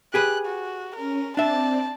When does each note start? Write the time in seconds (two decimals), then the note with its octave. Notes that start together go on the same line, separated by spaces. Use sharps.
0.14 G4 G#4 B4 F#6
0.46 F#4
0.96 C#4 A#4
1.37 C4 D4 D5 E5 A5